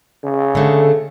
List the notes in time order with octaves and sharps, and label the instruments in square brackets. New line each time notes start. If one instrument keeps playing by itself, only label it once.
[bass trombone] C#3
[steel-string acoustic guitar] D3 A3